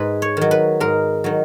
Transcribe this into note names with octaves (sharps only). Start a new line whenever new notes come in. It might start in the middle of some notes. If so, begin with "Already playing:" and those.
Already playing: G#2 B4
C#5
D#3 F#3
B4
G#2 A#4
D#3 F#3